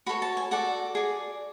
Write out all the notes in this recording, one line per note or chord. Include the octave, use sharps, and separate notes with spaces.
F#4 A4 C#5 B5
A5
G#5
F#4 A4 D5 F#5
G#4 D5